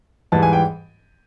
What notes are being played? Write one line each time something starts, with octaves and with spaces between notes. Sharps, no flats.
G#2 E3 G3 A5
G#5
G5